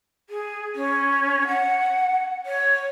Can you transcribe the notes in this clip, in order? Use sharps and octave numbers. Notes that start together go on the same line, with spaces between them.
G#4
C#4
F#5
C#5